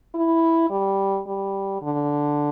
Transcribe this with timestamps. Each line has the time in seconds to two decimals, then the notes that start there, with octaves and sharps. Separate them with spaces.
0.15 E4
0.70 G3
1.27 G3
1.82 D3